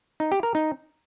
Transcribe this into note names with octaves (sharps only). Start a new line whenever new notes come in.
D#4
G4
A#4
D#4